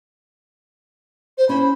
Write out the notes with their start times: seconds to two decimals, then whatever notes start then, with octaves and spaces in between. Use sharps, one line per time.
1.38 C5
1.49 C#4 E4 C5 B5